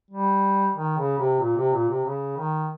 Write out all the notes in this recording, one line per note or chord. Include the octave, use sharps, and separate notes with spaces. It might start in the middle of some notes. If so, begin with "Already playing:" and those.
G3
D#3
C#3
C3
A#2
C3
A#2
C3
C#3
D#3